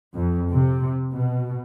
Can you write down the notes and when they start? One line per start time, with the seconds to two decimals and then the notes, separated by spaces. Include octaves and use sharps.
0.14 F2
0.52 C3
1.11 B2